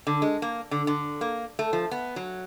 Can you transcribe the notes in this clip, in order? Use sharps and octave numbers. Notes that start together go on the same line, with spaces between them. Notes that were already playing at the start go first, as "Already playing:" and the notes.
D3
G#3
A#3
D3
D3
A#3
A3
F3
B3
F#3